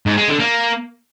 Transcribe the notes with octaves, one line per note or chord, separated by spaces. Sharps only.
G#2
G#3
D3
A#3